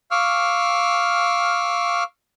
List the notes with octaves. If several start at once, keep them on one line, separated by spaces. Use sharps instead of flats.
F5 C#6 D6 E6 F6